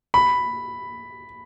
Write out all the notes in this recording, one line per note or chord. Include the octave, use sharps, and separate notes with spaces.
B5